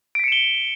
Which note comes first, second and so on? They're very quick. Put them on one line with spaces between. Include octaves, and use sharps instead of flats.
D7 B6 C#7 E7 G7